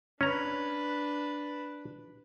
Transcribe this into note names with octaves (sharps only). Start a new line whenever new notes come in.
C#4 D4 B4 A#5